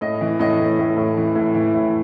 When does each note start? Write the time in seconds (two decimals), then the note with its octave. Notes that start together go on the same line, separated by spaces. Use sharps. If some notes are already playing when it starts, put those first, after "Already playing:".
0.01 A2 D#5
0.21 E3
0.39 A2 D#5
0.59 A2
0.79 A2
0.97 A2
1.17 E3
1.35 A2
1.55 E3
1.74 A2